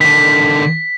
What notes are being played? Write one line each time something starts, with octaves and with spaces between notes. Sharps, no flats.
D3 D#3 B6